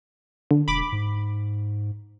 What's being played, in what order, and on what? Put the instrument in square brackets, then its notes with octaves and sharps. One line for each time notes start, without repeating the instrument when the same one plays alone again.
[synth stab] D3
[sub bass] E1 [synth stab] B5 D6
[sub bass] G#2